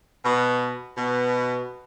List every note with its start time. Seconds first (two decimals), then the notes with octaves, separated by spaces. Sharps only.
0.24 B2
0.96 B2